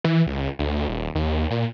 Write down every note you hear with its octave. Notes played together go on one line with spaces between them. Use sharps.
E3
C#2
D2
D#1
D#2
A#2